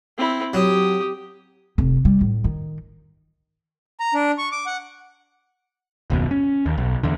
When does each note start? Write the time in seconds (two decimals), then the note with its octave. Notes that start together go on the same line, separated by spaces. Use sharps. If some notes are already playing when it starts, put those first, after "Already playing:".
0.18 C4 E4
0.54 F#3 G4 D#6
1.78 F1
2.05 G3
2.21 A2
2.44 D#3
4.00 A#5
4.14 D4
4.38 C#6
4.52 D6
4.66 F#5
6.10 F#1 D#2 B2
6.31 C#4
6.66 D#2
6.78 B1
7.03 E2 D3